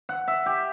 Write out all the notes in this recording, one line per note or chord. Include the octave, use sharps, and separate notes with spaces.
F#5
E5
G4